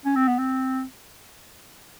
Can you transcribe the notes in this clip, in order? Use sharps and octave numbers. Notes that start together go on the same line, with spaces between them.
C#4
C4
B3
C4